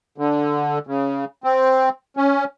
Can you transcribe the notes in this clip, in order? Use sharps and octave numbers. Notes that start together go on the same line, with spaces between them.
D3
C#3
C4
C#4